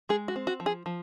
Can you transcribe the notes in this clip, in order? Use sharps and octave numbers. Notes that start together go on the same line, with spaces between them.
G#3 G#4
F#4
C4
F#4
F3
G#4
F3